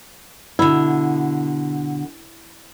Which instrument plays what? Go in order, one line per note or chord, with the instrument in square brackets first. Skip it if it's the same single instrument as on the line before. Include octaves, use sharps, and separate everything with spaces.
[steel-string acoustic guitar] B2 D3 [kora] E4